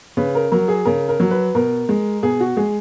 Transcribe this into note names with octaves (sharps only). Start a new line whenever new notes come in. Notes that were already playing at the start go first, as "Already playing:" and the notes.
C#3 B4
A#4
F#3 A#4
G#4
C#3 A#4
A#4
F#3
B4
B2 A#4
G#3
B2 G#4
F#4
G#3 G#4